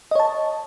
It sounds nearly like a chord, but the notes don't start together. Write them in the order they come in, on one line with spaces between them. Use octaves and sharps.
D#5 C#5 A5